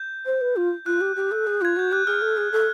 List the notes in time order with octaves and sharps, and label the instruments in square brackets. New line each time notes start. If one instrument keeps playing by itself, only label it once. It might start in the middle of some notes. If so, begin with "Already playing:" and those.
Already playing: [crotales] G6
[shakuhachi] C5
B4
F4
[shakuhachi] F4 [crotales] F#6
[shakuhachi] G4
G4
A4
G#4
[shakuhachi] F4 [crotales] G#6
[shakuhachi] F#4 [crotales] G6
[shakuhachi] G4 [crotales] F#6
[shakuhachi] G#4 [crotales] F6
[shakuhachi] A4
G#4
A4